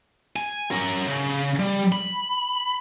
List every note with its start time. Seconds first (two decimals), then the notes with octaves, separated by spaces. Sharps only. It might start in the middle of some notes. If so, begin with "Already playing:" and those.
0.36 G#5
0.71 C#4 A#4
1.07 C#3
1.59 G3
1.92 B5